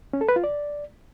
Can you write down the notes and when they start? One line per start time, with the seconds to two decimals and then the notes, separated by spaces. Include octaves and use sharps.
0.13 C#4
0.21 A4
0.29 B4
0.36 F4
0.44 D5